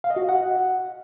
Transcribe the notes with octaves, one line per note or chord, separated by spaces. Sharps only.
F5
D#5
F#4
D#5
F#5